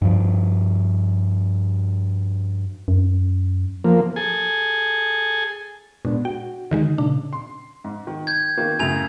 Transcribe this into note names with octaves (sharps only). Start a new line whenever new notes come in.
G2 F3
F#2
F3 A#3
G#4 A4 G#5
A#2 G#3 B3 D4
F#4 G5
D3 D#3 G#3 D#4
A#2 C#3 D4
C6
G#2
D#3
G6 G#6
D#3 A#3
F#2 A2 C#3 G#5 F7